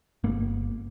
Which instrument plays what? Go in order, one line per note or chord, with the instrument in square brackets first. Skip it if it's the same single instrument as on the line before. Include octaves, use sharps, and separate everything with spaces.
[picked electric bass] G1 A#3